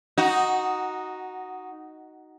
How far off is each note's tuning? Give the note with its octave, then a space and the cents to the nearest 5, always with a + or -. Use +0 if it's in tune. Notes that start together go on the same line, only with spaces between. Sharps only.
D#4 +0 F#4 +0